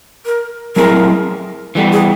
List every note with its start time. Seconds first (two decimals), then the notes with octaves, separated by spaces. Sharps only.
0.26 A#4
0.76 F#3 A3 C4 E4 G#4 A#4
1.75 E3 G3 B3 A4
1.92 G#4